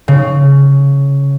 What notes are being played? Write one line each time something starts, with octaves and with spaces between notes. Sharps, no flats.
C#3